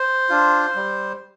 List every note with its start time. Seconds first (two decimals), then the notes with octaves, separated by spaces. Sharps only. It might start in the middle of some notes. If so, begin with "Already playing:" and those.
Already playing: C5
0.29 D4 F4
0.75 G3